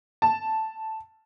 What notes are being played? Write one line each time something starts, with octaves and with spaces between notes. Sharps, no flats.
A5